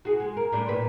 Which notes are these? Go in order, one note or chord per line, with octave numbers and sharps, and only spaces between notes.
F#4 G#4
G#3
A#4
A2 G3 D4
A#2 B4